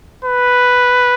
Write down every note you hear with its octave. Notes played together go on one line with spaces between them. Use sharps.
B4